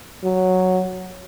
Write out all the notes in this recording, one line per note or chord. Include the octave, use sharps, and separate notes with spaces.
F#3